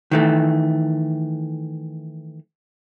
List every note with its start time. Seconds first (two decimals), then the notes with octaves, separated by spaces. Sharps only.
0.11 D#3 E3 A3